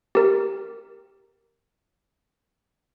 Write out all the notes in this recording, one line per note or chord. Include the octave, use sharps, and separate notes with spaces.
G4 A#4